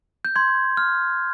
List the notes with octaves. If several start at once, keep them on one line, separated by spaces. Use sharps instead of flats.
G6
C6 G#6
F6